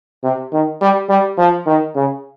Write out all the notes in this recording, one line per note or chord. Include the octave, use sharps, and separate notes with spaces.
C3
D#3
G3
G3
F3
D#3
C#3